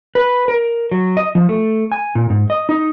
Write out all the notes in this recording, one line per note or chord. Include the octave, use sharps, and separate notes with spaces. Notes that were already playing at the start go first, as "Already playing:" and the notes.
B4
A#4
F#3
D#5
F3
A3
G#5
A#2
G#2
D#5
D#4